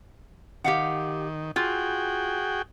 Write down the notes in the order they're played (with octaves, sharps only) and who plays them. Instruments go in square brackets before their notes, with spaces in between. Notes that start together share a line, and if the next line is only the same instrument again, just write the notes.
[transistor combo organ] D#3 [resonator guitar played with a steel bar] G4 F5 F#5
[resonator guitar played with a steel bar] F4 [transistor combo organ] F#4 G#4 G5